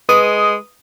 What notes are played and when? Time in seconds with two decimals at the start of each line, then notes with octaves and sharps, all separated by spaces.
0.09 G#3 B4 D#6